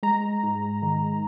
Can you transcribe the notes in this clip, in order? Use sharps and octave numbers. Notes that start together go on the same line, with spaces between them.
G#3 A#5
G#2
D#3